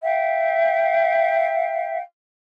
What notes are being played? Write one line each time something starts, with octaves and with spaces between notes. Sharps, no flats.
E5 F5 G5